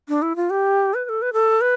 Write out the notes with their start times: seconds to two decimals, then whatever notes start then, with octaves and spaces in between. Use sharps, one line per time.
0.09 D4
0.22 E4
0.36 F4
0.50 G4
0.94 B4
1.05 B4
1.09 A4
1.22 B4
1.33 A4
1.61 B4